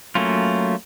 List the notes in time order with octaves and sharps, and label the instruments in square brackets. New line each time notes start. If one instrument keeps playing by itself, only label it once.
[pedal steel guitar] F#3 A3 A#3 C#4 F4